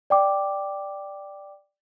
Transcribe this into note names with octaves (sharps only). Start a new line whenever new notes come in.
D5 G5 D6